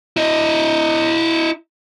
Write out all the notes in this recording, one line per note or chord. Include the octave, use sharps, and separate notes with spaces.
E4 D#5